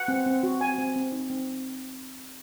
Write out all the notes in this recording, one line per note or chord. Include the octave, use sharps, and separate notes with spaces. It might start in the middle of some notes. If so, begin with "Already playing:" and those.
Already playing: F#5
C4
C4
F#4
C4 G#5
C4
C4
D#4
C4